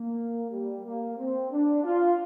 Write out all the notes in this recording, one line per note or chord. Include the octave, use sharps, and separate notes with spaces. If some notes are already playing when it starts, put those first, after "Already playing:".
Already playing: A#3
G3
A#3
C4
D4
F4